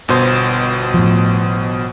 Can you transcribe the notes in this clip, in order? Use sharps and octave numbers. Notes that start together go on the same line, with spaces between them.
G1 B2 C5
A2 F3